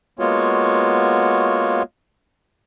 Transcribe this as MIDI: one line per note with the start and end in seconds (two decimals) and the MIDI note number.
0.19 1.82 56
0.19 1.82 58
0.19 1.82 59
0.19 1.82 65
0.19 1.82 66
0.19 1.82 73